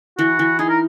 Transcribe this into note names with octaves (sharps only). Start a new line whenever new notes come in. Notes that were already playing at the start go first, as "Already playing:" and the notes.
E3 F#4
E3
D#4 G#4
A#4